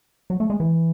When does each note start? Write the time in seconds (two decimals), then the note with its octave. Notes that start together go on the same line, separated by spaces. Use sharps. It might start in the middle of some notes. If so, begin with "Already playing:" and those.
0.30 F#3
0.40 A3
0.50 G#3
0.60 E3